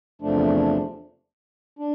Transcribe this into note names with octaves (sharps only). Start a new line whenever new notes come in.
E2 C3 F3 A3 D4
D4